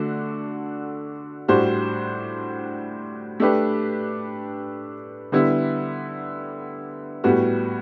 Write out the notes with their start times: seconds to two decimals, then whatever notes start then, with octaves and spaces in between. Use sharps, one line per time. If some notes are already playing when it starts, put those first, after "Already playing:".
Already playing: D3 A3 D4 F#4
1.48 A2 G3 D4 F#4 C5
3.40 A3 D4 G4 B4
5.32 D3 G3 B3 E4
7.24 A2 G3 B3 F#4